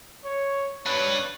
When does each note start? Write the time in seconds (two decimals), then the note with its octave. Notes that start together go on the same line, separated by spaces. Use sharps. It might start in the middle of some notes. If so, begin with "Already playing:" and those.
0.24 C#5
0.86 D4 B4 C#5